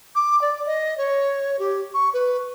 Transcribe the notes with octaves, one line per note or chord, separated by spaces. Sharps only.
D6
D5
D#5
C#5
G4
C#6
B4